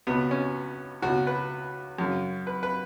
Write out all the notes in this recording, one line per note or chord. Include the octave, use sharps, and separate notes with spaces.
C#2 B2 B3
C#4
C#2 B2 F#4
B4
F#2 C#3
B4
B4